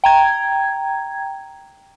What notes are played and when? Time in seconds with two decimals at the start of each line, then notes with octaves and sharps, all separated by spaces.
0.04 G5 A#5 G#6